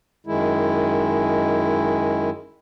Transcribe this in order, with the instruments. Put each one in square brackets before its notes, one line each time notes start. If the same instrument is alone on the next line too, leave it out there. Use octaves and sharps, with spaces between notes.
[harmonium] F#2 D#3 G#3 E4